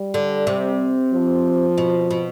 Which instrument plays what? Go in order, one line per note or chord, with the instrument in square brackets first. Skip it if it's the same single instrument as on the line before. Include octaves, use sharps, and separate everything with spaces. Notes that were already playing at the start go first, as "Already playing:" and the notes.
Already playing: [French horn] G3
[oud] D3
C3
[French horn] F3
[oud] B2
B2